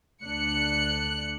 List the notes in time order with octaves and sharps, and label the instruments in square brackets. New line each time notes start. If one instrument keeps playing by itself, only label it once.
[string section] D2 D4 F#6 C#7